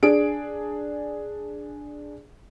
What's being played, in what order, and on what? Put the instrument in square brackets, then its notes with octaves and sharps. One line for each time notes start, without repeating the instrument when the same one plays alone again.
[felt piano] D4 G#4 D7